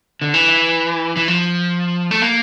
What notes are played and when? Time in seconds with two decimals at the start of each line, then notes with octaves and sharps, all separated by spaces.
0.22 D3
0.34 E3
1.17 E3
1.28 F3
2.11 A3
2.22 A#3